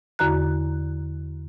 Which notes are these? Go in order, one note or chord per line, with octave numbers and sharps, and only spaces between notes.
E2 D3 F#4 A#5 F#6